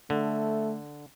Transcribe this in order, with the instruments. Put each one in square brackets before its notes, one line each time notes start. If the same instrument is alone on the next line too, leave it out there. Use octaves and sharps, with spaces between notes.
[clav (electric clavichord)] D3 [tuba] A3